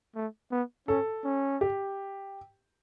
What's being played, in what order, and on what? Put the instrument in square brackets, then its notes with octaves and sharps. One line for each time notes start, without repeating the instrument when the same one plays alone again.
[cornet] A3
B3
[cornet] C#4 [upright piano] A4
[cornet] C#4
[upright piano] G4